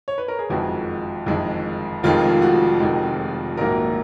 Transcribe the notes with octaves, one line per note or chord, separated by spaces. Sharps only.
C#5
B4
A#4
G#4
F#1 F2 D#3 G#3 F#4
F#1 F2 D#3 G#3
F1 F2 D#3 G#3 F4
F#4
F1 F2 D#3 G#3
A#1 G#2 D#3 F#3 A#3 A#4